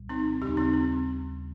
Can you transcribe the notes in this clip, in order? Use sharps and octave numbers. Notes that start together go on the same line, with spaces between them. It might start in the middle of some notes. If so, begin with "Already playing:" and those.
Already playing: C2 A#2 G3
C4 D#4
D#2 C#3 G3 D#4 G4
C4 D#4
C4